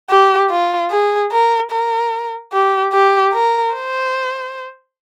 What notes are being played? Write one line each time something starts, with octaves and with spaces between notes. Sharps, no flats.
G4
F4
G#4
A#4
A#4
G4
G4
A#4
C5